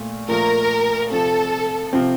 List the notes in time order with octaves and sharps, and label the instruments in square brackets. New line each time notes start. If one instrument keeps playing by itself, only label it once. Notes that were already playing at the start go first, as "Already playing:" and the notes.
Already playing: [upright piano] A#2 A3
[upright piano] A#2 F3 A3 [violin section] A#4
[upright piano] C3 F3 C4 [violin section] A4
[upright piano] C3 F3 C4